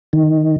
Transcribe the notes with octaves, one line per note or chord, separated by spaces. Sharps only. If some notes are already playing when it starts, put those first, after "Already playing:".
D#3